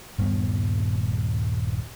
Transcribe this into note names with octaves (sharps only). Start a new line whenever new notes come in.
D#1 G2 A#2 B3